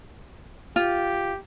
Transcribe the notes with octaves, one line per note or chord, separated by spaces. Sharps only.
F4 G4